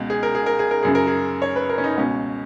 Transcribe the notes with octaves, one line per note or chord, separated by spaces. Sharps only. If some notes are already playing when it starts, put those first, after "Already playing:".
Already playing: C#2 B2
G#4
A#4
G#4
A#4
G#4
A#4
F#2 C#3 G#4
A#4
G#4
C#5
B4
A#4
C#4
D#4
C#2 B2 C#4